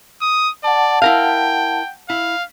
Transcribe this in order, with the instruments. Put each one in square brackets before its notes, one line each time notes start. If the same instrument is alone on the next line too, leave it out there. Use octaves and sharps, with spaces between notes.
[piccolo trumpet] D#6
[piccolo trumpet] D5 [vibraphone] F#5 A5
[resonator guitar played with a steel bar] E4 A#4 F5 [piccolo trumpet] G5
[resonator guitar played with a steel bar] E4 [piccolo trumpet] F5